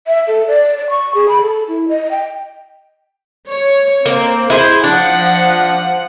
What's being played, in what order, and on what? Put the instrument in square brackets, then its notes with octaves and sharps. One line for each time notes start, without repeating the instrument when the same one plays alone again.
[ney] E5
A4
D5
D5
C#6
G#4
B5
A4
E4
D#5
G5
[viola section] C#5
[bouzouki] A#3 [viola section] C4
[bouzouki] E4 G#4 C5
[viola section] F3 F#5 [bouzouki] D4